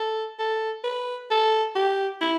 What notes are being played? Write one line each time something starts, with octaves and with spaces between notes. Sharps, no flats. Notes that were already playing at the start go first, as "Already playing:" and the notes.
Already playing: A4
A4
B4
A4
G4
E4